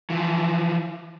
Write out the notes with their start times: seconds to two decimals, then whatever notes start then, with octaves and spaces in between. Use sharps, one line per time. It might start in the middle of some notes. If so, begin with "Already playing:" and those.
0.10 E3 F3